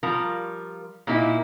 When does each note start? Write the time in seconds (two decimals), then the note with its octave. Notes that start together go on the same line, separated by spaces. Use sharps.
0.03 F3 G3 F4 A#4
1.07 A#2 A#3 D#4 E4